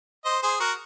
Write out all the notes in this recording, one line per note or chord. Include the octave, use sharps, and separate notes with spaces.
C5 D#5
G#4 C5
F#4 A#4